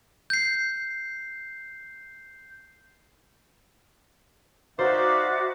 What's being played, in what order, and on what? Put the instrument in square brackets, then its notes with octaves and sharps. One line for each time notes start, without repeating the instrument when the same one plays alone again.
[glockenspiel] G6 C7
[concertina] D#4 D5 F5 [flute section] F#4 E5 D6 [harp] C5